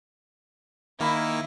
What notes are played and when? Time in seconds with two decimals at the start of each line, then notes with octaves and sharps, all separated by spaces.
1.00 D#3 A#3 E4